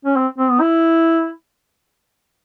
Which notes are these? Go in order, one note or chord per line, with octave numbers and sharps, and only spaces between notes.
C#4
C4
C4
B3
E4